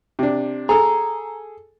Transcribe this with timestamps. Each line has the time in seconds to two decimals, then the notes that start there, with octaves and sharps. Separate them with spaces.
0.19 C3 D4
0.69 G#4 A4 A#5